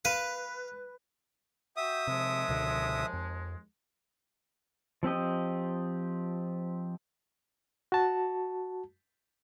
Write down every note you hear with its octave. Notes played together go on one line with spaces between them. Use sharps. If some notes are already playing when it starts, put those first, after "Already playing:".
B4 F5
F#4 E5 G5 D#6
D#2 C3 F3 G#3
C#2 B2 D3
F2
F3 C4 G4 D#5
F#4 A5